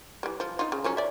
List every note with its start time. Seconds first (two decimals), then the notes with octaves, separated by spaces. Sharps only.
0.23 E3 G3
0.40 F3
0.59 D#4 F4
0.72 C#3
0.84 F3 F#3 C#4
0.97 D5 E5